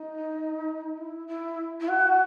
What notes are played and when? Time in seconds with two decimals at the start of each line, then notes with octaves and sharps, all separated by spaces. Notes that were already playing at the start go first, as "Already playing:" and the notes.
Already playing: D#4
0.97 E4
1.27 E4
1.80 E4
1.88 F#4